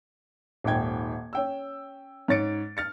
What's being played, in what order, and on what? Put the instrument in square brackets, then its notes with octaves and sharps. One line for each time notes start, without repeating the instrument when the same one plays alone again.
[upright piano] D#1 G#1 D#3 G5 G#6
C#4 G5 E6
G#2 C#4 C#5 A6 C#7 D7
F6 A6 C#7